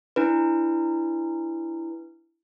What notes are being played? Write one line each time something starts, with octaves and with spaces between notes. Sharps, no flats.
D4 E4 B4